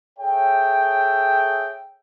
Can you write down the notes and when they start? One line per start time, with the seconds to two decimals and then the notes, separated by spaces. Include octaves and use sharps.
0.19 G#4 A4 C#5 E5 G5